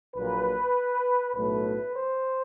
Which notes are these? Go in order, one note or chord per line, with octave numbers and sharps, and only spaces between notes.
A#1 A#2 F#3 B4
B1 A2 F#3 A3 B4
C5